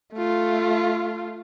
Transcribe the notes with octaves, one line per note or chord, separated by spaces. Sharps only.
A3 F4